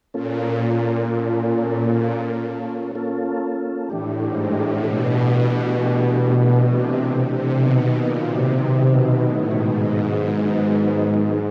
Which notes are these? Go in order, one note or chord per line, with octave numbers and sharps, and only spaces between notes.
A#2 A#3 C#4 F4 A4
A#3 C#4 F4 A4
A#3 C#4 F4 A4
A#3 C#4 F4 A4
A2 E3 A3 D4 G4
G#2
A2
B2 E3 A3 D4 G4
E3 A3 D4 G4
C3 E3 A3 D4 G4
C3
B2 D#3 F#3 B3 D#4
A#2
C3
C3 D#3 F#3 B3 D#4
B2
A2
G#2 D#3 F#3 B3 D#4
D#3 F#3 B3 D#4